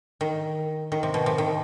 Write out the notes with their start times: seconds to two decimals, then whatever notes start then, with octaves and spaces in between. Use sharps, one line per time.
0.21 D#3
0.92 D#3
1.03 C3
1.14 B2
1.26 C3
1.38 D#3